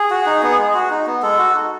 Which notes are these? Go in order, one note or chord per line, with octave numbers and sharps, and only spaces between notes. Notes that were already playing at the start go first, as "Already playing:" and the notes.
Already playing: G#4
F#4
D#4
B3
G#3
F#4
D#4
B3
G#3 A4
F#4
D#4